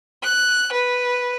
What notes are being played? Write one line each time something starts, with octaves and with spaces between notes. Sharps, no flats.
F#6
B4